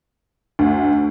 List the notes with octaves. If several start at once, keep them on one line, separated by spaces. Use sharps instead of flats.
D2